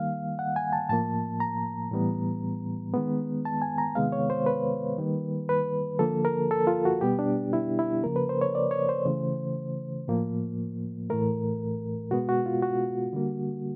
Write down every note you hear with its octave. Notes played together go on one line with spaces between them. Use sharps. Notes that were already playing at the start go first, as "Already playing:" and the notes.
Already playing: D#3 G3 A#3 F5
F#5
G#5
A5
A2 F3 A#3 A5
A#5
A2 E3 G3 B3
D#3 G#3 B3
A5
G#5
A#5
C3 D#3 G#3 B3 F5
C#5
C5
B4
D#3 G3 A#3
B4
D3 F3 A#3 A4
A#4
A4
F4
F#4
B2 G3 B3 G4
D4
E4
E4
C#3 F3 A#3 A#4
B4
C5
C#5
D5
C#5
C5
C#3 E3 A3
A2 F3 A#3
A2 E3 A3 A#4
B2 G#3 B3 F#4
F#4
F4
F#4
D3 G3 A#3